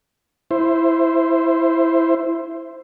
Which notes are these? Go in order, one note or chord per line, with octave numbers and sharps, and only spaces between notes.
E4 C5